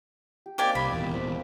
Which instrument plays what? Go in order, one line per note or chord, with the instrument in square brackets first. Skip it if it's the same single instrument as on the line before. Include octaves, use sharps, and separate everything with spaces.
[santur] G4
[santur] A#3 C4 D#4 [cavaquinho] G4 D5 G#5
[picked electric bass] C2 [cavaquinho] B5
[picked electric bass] D#1 E2
[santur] C4